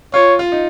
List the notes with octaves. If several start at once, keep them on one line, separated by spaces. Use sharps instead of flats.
F4 C#5
F4
D#4